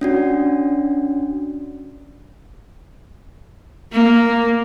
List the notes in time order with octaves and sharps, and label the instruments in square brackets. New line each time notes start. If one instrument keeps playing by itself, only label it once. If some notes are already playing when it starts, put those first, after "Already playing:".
[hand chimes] C#4 D4 F#4
[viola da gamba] A#3